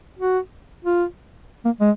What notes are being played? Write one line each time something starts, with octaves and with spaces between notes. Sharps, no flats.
F#4
F4
A#3
G#3